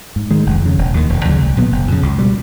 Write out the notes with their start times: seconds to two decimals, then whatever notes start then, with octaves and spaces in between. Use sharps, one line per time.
0.16 G#2
0.31 D#3 G#3
0.46 F1
0.62 F2 C#3
0.78 E1
0.94 D#2 D#3
1.09 E1
1.25 D2 C#3 F#3
1.40 C2
1.57 A#2 F#3 B3
1.72 F#1
1.87 F2 C#3
2.03 C#2
2.18 B2 G3